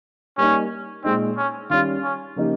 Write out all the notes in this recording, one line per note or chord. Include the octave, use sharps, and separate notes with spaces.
G3 A#3 C#4 D#4
A#2 G#3 C4 D#4
C#4
D#3 G3 C#4 F4
C#4
C#3 F3 A#3 D#4 G4